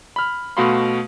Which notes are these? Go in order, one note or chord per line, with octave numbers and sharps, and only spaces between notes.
B5 F6
B2 A3 F#4 F5 B5 C6